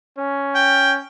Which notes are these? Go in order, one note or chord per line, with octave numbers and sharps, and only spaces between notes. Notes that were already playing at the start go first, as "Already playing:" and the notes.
C#4
G5